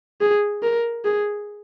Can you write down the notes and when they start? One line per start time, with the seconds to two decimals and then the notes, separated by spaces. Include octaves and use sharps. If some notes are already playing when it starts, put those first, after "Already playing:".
0.21 G#4
0.63 A#4
1.05 G#4